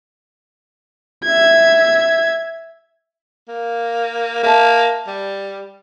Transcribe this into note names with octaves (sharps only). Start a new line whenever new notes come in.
E5 G#6
A#3
A#3 E5 A5
G3